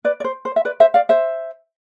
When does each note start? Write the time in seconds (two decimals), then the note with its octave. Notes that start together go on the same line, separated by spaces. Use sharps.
0.05 B4 D5
0.20 D5
0.24 C5
0.45 C5
0.56 E5
0.65 B4 D5
0.80 C5 E5
0.94 D5 F5
1.09 C5 E5